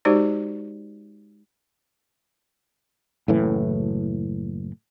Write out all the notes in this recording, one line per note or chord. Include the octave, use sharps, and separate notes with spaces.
G#3 D#4 F#4 G4 C5 D5
F#1 A2 E3